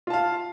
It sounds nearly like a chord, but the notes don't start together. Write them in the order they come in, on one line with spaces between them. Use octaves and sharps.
F4 A5 F5